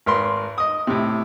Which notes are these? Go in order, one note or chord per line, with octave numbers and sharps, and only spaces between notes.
G#1 A#4 B4 C6
D#5 D#6
A2 C3